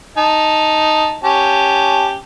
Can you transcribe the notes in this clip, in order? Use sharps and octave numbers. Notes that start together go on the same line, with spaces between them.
D#4 A5
C#4 G4 A5